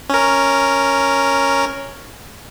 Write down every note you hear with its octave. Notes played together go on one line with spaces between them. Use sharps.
C#4 A#4